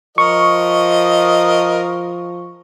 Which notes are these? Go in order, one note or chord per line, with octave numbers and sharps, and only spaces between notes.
F3 A#4 D#5 C#6